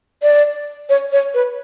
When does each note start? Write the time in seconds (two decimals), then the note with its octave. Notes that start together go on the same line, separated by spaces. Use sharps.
0.23 D5
0.89 C#5
1.12 C#5
1.34 B4